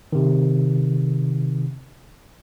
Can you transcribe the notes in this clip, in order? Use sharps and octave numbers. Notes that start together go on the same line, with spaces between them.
C3 D#3